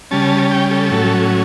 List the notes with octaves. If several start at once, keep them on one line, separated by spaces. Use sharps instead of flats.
C#3 G3 C#4 A5
G5
A4
A2 F#3 C#4